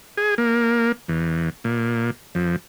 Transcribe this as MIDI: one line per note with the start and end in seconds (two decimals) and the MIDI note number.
0.17 0.35 68
0.38 0.92 58
1.08 1.49 40
1.64 2.11 46
2.35 2.56 41